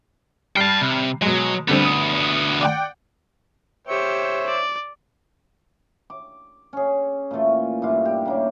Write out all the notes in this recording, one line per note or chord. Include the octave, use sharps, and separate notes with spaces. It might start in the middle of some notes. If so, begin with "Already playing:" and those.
G3 G5 A5 F6 C7
C3
B2 F#3 G#3
D2 D3 G3 B3 C4
D#6
D5 F#5 G5
G4 C5 C#5 E5 C#7
D5
D6
C#4 G#4
A#2 E3 A3 F4
G2 E4 F4 D6
G4
C#3 A#3 E4